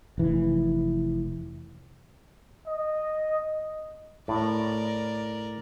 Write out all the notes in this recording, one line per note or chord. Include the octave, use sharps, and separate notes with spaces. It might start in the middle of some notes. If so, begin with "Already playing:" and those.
F1 E3
D#5
A2 A#4 D5